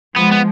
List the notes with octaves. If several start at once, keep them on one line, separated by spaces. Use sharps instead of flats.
F3 G#3 B3
B3